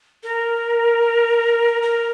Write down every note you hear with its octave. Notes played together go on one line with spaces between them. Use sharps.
A#4
A#4